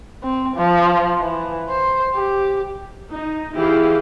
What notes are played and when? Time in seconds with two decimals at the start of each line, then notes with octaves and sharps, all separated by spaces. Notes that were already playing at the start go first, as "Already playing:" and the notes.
0.23 C4
0.57 F3
1.20 E3
1.69 C5
2.15 G4
3.12 D#4
3.55 E3 E4 G4 G#4 F5